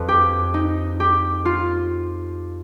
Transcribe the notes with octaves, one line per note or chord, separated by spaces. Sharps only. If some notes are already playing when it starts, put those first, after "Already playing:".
Already playing: F2 B4
G4
D#4
G4
F4